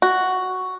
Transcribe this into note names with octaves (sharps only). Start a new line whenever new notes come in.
F#4